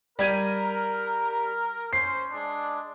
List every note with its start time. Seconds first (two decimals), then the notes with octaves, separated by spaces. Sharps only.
0.19 G3 A#4 G#6 D#7
1.93 C#4 C5 C7
2.31 G#3 D4